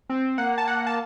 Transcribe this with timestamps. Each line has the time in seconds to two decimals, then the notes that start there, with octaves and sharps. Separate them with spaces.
0.09 C4
0.38 A#3 F#5
0.58 A5
0.68 F#5
0.87 A5